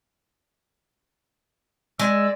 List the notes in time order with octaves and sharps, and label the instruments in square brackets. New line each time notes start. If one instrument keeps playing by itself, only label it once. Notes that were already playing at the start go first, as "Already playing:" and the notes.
[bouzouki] G#3 [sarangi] D5 [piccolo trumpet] E6